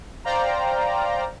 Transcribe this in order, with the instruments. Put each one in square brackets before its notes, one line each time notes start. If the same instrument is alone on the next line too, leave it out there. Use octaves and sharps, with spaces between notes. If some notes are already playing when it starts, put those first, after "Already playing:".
[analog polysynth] C5 D5 F5 G5 A#5